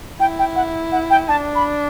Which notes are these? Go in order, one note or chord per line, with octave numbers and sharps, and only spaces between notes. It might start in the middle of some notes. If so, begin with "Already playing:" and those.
E4 G5
G5
F#5
F#5
G5
D4 A5
B5